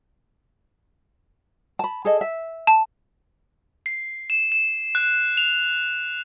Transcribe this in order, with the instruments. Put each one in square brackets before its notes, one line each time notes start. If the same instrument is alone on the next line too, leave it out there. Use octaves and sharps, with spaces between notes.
[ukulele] A5 B5
G#4 A4 D#5
E5
[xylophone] A5
[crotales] C7
E7
E7
F#6
F7